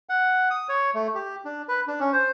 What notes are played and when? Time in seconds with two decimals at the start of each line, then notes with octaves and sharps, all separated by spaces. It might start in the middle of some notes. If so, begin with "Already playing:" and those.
0.09 F#5
0.51 D#6
0.69 C#5
0.94 A3
1.15 G4
1.45 D4
1.69 B4
1.88 D4
2.00 C#4
2.13 C5